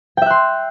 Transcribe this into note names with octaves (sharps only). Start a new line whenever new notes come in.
E5 G5 C6 F#6